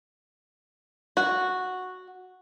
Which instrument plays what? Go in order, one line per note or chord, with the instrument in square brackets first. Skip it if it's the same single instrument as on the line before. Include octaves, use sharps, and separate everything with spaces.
[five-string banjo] F#4